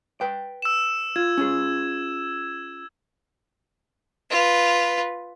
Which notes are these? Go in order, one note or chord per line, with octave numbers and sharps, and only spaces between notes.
B4 G5
E6 E7
F4 G#6
C#4 F4 G#4
F4 B4